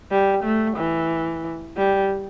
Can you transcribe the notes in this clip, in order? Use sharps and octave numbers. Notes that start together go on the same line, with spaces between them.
G3
A3
E3
G3